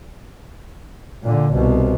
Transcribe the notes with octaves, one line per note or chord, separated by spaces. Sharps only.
A#2 D3
C2 B2